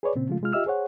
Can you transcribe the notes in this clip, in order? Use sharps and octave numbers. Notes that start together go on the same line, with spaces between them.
G#4 B4 C#5 D5
A#2 C#3 C4
C#3 F3 G#3 A3 F4
C3 G#3 F4 F6
F4 G4 D#5 E5 E6 F6
G#4 C5 C#5 F#5